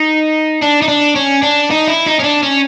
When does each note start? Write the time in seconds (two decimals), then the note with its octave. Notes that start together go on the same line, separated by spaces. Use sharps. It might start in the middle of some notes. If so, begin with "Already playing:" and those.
Already playing: D#4
0.62 D4
0.82 D#4
0.88 D4
1.16 C#4
1.43 D4
1.71 D#4
1.88 E4
2.06 D#4
2.20 C#4
2.24 D4
2.43 C#4